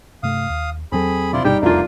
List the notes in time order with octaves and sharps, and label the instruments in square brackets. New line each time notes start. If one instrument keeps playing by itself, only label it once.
[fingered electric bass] G2 C3 A3 [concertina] F5 D#6
[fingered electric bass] D#2
[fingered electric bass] E2 F#3 [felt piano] C4 A4 [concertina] G#4 B5
[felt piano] C3 [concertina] E4 F4 D5
[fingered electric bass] G1 G2 B2 [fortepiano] G3 [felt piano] D#4 [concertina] G4 G5
[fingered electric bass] E1 F2 [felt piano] C2 D#4 [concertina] A3 A#3 [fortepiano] D4 F4